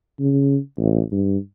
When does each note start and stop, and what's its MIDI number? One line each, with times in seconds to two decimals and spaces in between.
0.19 0.57 49
0.77 1.01 33
1.12 1.37 43